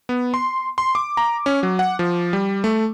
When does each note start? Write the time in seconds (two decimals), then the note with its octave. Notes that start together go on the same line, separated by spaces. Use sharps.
0.09 B3
0.34 C6
0.78 C6
0.95 D6
1.17 A#5
1.46 C#4
1.63 F#3
1.79 F#5
1.99 F3
2.33 G3
2.64 A3